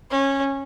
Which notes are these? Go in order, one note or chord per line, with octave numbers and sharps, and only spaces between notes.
C#4